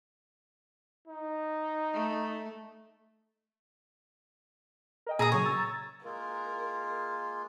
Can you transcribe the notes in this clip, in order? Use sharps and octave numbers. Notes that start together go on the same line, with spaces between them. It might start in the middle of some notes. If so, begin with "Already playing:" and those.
D#4
A3
A#4 D#5 G5
A#2 G#4 A#5 D#6
C#3 F#3 C#5
A#5 E6 A6
G#3 A#3 F4 A#4